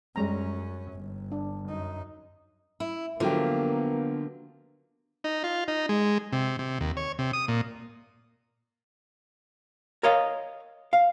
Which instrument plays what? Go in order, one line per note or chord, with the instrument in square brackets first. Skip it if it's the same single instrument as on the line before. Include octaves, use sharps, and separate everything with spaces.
[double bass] F#2 C#4 [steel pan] G3 G#3 A#5
[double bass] G1
[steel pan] D4
[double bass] F#2 D#4
[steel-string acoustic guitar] E4
[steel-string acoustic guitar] D3 [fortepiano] F3 F#3 G4 [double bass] A#3 [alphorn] B3
[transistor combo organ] D#4
F4
D#4
G#3
C3
C3
D#2
C#5
C3
D#6
A#2
[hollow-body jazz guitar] A#4 C#5 D#5 F5
F5